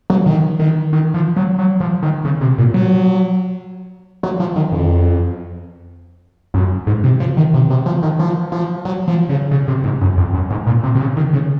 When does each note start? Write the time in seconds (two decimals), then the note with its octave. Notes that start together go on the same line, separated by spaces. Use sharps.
0.10 F#3
0.26 D#3
0.59 D#3
0.93 D#3
1.14 F3
1.36 F#3
1.59 F#3
1.80 F3
2.03 D#3
2.25 C#3
2.41 C3
2.58 A#2
2.74 F#3
4.23 F#3
4.40 F3
4.56 D#3
4.72 F2
6.54 F#2
6.87 G#2
7.04 C3
7.20 F3
7.37 D#3
7.54 C3
7.70 C3
7.86 F3
8.03 D#3
8.19 F3
8.52 F3
8.85 F#3
9.08 F3
9.29 C#3
9.51 C#3
9.68 C3
9.84 G#2
10.01 F#2
10.18 F2
10.34 F#2
10.51 G#2
10.67 A#2
10.84 C3
10.95 C3
11.00 C#3
11.17 D#3
11.33 C#3